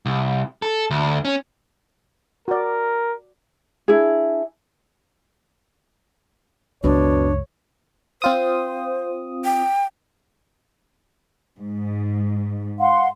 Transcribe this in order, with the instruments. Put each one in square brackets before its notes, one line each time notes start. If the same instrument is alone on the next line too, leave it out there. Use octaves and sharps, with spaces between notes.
[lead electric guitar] C2
A4
D2
C#4
[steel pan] F#4 D5 [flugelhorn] A#4
[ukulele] D4 E4 G#4
[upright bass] C#2 F#2 [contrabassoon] B2 [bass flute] D4 [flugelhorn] C#5
[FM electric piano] C4 F4 D#6 [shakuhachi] C5
[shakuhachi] G5
[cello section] G#2
[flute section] F5 F#5 C6